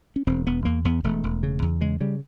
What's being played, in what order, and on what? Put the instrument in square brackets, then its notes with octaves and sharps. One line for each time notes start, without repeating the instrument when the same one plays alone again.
[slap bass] C#4
E1 C4
E1 B3
E2 A#3
E2 B3
E1 A3
E1
C#3
E2
C#3 G#3
C#3 G3